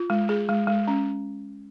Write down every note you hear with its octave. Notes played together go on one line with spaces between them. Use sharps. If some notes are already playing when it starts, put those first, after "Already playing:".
Already playing: F4
G#3
G#4
G#3
G#3
C#4